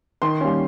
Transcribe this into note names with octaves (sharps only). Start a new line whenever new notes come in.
D#3 C6
G3 A#3 C#4